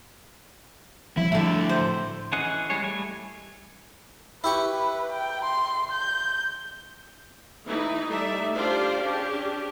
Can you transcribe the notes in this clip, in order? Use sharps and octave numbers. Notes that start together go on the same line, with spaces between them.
F3 G3 E4
A2 D3 E4 A4
C5
E3 C#4 G#4 D#5 F#5
G3 G#3 G#4 C#5
G3 A3 G#5
E4 G4 B4 C#6
G5
C6
G6
E3 D#4 E4
G3 A3 D#4 D5 E5
D4 F4 G4 C5 D5 F5
C#4 D4 G4 G#4